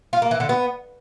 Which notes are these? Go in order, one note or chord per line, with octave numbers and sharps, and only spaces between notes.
F4
A#3
E3
D3
B3